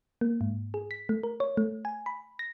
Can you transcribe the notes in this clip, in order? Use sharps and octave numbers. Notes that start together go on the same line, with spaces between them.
A#3
G#2
G#4
B6
A3
A#4
C#5
A3
G#5
B5
A#6